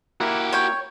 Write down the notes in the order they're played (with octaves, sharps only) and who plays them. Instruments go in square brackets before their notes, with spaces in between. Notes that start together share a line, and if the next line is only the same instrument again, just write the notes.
[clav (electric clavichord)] A#3 E4 [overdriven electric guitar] F#4 G4
[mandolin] C#5 G5